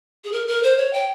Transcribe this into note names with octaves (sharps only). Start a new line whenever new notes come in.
G#4
A#4
A#4
C5
C#5
G5